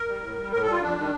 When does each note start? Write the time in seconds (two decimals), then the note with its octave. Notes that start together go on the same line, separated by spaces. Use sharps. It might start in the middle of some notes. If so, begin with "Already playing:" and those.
Already playing: A#4
0.08 G3
0.23 A2
0.38 G3
0.52 A2 A#4
0.62 G3 A4
0.72 F4
0.81 F2 D4
0.96 D#3 G3